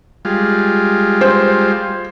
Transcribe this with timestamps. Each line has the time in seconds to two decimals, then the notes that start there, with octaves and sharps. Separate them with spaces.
0.25 G3 G#3 F4
1.21 C5